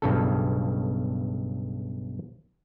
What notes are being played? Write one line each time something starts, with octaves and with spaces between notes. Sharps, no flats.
B1 G2 C#3 A4